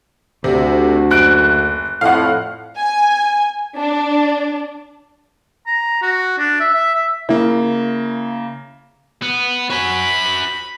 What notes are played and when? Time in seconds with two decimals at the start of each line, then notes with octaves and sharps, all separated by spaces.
0.44 D2 C3
1.11 F#1 F#6 D7
2.01 F2 A2 F5 F#5
2.77 G#5
3.77 D4
5.67 A#5
6.02 F#4
6.38 D4
6.60 E5
6.74 E5
6.94 E5
7.29 C#3 A#3 E4
9.22 B3
9.70 F#4 G#5 B5